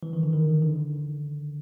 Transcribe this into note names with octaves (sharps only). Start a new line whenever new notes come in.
E3
D#3
D3
D#3
D3